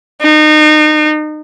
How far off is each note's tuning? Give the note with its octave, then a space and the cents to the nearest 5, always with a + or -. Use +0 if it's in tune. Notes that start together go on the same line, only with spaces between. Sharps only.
D#4 -30